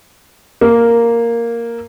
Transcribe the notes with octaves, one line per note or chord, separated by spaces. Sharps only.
A#3